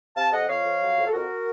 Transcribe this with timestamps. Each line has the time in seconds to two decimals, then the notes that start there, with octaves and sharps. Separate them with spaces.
0.16 C3 F5 A5
0.32 F2 D#5 F#5
0.49 F2 C#5 F5
0.65 F2
0.81 F#3
0.97 F2
1.07 A4
1.12 F2 F#4 A#4